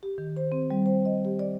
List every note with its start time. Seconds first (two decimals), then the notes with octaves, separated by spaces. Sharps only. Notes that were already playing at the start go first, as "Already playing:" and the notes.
0.03 G4
0.18 D#3
0.37 C5
0.52 C4
0.71 G3
0.86 C5
1.05 D#5
1.25 G4
1.39 D5